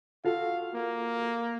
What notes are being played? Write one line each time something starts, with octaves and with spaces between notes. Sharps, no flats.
F4 F#4 A4 F5
A#3